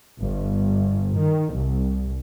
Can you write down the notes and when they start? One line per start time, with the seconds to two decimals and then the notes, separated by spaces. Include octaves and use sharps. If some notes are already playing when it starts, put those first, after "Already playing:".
0.22 G1
1.19 D#3
1.55 C2